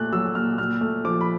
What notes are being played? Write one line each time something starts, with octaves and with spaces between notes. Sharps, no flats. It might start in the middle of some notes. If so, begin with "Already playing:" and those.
Already playing: A#2 A3 F#6
F#3 E6
A#2 F6
A#2 F6
A3
F3 D6
B5